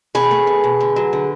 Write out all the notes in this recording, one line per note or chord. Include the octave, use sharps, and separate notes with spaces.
B2 G#4 B4
A3
B2
B2
D3
F#3
D3